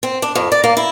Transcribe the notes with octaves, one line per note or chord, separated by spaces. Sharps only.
C4
D4
F2
D5
A#3
E4